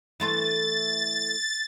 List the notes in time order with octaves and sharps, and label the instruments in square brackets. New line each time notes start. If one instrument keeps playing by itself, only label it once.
[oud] E3 A3 C5 [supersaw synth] A6